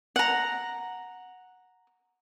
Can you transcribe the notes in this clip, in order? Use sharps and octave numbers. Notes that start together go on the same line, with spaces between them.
F#5 A#5